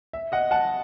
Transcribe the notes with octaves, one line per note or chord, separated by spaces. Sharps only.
E5
D#5 F#5
F#5 A5